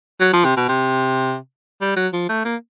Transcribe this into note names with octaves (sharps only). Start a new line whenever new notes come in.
F#3
F3
C3
B2
C3
G3
F#3
F3
A3
A#3